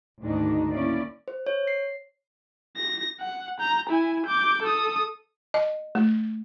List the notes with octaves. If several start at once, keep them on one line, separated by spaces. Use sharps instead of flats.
D2 G#2 D#3 D4 D#4
A#3 C#4 E4 D5
C5
C#5
C7
A#6
F#5
A#5 G6
E4 G#5
D6 G6
A4 D#6
D#5
A3